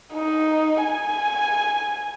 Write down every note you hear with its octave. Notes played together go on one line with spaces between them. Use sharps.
D#4
G#5